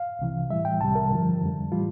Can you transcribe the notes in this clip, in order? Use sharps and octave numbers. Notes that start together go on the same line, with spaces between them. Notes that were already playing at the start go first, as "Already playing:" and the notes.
Already playing: F5
C2 C3 E3
A2 E3 G3 E5
G5
C2 C3 G3 A5
A#4
G2 D3 F3
F2 D3 G3
A2 E3 G3 F4